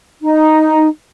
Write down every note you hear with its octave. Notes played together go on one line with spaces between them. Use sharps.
D#4